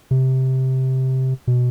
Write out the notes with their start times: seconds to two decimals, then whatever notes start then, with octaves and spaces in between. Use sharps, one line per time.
0.11 C3
1.47 B2